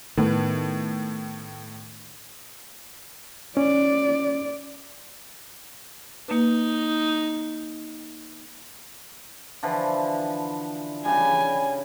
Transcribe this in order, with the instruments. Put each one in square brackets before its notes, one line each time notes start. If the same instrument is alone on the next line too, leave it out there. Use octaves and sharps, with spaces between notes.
[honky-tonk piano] A2 [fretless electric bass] D#3 B3
[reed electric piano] C#4 [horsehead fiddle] D5
[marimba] A#3 B4 [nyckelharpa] D#4
[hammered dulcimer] D3 E3 F3
[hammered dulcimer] C#3 G3 [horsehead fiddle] G#5